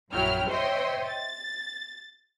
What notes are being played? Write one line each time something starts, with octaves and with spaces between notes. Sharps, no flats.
A#1 F#2 F#3 E4 G5 F6
C5 C#5 D#5 E5 G5 C6
A6